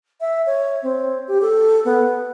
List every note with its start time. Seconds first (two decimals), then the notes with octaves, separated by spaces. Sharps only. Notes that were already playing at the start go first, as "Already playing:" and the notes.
0.21 E5
0.46 C#5
0.83 C4
1.28 G4
1.42 A4
1.85 B3